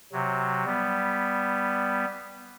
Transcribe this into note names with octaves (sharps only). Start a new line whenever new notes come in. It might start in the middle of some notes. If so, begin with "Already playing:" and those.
C3 F#3
G3 B3